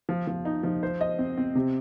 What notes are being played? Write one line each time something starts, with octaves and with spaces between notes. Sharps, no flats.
F3
F3
D#4
F3
C5
D#5
C4
C4
C3